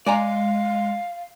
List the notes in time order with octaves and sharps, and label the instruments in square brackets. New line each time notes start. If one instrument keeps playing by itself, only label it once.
[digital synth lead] G#3 [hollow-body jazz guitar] D5 G#5 A#5 [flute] F5